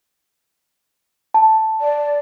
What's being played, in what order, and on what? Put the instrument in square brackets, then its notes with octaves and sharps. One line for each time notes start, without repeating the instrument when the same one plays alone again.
[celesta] A5
[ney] D5